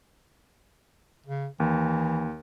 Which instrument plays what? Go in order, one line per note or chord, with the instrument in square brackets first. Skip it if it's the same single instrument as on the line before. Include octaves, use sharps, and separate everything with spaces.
[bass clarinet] C#3
[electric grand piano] D#2 [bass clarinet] E3